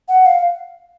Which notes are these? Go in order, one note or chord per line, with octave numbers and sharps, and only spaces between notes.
F#5
F5